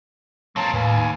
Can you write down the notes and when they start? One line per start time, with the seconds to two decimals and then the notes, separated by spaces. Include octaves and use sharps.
0.56 F#3 A#3 C4 A5
0.74 D#2 A2 B4 F5 G#5